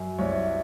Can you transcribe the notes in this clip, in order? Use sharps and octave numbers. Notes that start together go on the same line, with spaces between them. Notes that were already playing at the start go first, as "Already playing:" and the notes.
Already playing: F#2
C2 C#5